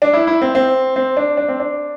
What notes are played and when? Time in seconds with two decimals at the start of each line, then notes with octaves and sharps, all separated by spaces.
0.02 D4
0.13 E4
0.27 E4
0.42 C4
0.55 C4
0.96 C4
1.17 D4
1.37 D4
1.48 C4
1.60 D4